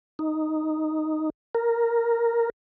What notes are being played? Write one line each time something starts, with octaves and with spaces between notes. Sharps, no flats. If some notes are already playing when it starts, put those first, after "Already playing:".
D#4
A#4